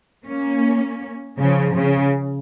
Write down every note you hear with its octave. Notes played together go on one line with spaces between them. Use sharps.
A#3 C#4
C#3 F3
C#3